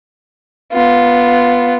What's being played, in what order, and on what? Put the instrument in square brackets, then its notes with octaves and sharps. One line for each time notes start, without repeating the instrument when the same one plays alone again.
[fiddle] B3 F4